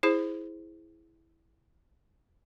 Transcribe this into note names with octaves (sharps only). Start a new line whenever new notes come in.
E4 G#4 C5